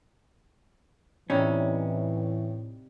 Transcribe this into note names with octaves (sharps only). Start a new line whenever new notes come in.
A2 C3 E3 G3 C#4 D#4